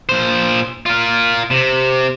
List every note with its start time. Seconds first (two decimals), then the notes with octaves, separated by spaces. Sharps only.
0.09 A#2 C5
0.86 F4 A#4
1.51 C3